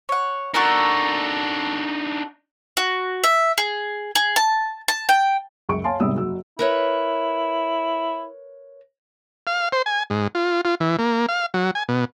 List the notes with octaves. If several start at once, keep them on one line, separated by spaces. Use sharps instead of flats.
C#5 F#5
D4 D#4 F#4 A4 A#4
F#4
E5
G#4
G#4
A5
A5
G5
C#2 F#2 C#6 D7
C#5 F5 G#5 A5 C6
G#1 E2 C3 G3 D#6 E6
F#1 F#4 E6
E4 A#4 B4 C#5
F5
C5
G#5
G#2
F4
F4
E3
A#3
F5
F#3
G#5
B2